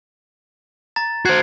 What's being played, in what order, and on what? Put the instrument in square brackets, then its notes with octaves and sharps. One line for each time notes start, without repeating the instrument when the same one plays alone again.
[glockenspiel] A#5 A6
[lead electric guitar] F#4 C5 [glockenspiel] F#6 G#6 C7